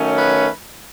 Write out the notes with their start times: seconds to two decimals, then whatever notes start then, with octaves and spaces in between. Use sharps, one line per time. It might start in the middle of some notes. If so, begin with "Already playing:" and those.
Already playing: D#3 F#3 A3 C#4
0.17 B4